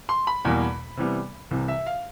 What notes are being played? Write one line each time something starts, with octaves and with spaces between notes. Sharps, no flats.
C6
B5
E2 B2 G3 A#3
C3 E3 G3 B3
C2 C3 E3
E5
F5